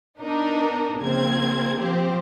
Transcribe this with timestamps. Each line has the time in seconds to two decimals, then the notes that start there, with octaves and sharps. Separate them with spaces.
0.20 B3 D4 D#4 A#4
0.99 A#1 C#3 C4 G#6
1.78 F3 C4 G4 C5